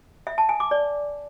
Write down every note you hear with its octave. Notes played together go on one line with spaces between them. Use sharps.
E5
A5
G#5
D6
D5